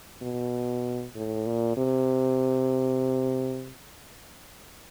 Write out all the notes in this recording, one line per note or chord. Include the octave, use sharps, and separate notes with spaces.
B2
A2
A#2
C3